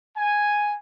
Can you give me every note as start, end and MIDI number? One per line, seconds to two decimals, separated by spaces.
0.16 0.74 80